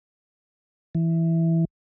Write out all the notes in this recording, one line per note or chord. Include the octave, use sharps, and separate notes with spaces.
E3